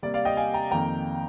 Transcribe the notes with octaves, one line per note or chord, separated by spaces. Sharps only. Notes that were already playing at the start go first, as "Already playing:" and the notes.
C3 G3 A#3 D5
D5 F5
D#5 G5
F5 G#5
G5 A#5
F2 D#3 A#3 G5 A#5